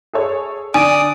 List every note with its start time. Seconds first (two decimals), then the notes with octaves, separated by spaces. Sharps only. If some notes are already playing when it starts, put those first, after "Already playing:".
0.13 G#4 A4 C#5
0.74 D3 D5 G#5 D#6